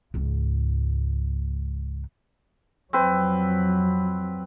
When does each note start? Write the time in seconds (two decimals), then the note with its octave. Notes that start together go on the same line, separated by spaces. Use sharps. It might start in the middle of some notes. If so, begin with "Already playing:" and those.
0.14 C#2 G#2
2.93 F2 F#3 C4 B4